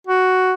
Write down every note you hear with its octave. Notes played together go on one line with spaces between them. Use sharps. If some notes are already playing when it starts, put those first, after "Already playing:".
F#4